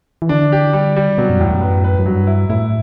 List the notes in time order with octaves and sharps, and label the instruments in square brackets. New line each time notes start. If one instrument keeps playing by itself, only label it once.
[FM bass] E3
[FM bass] D3 [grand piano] D4
[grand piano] G4
G3
G3
[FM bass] B2 [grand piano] F#3
[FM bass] F#2
[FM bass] E2 [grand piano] A2
[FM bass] F#2
[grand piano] B4
B4
[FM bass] F#2
[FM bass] G2 [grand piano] F#3
[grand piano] E4
[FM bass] A2 [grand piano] E4